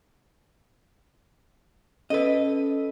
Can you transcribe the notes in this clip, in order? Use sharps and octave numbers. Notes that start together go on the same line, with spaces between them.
C#4 A4 B4 D#5 E6